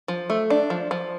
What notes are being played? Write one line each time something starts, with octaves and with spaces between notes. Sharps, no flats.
F3
A3
D4
F3
F3